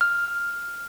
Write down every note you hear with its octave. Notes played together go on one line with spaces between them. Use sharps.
F6